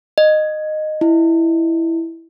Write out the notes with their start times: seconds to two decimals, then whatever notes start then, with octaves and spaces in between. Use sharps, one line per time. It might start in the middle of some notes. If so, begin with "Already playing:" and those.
0.18 D#5
1.01 E4